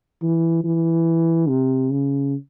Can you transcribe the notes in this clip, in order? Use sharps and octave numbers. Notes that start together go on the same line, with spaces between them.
E3
E3
C3
C#3